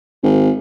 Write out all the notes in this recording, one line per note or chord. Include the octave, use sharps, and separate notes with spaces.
G#1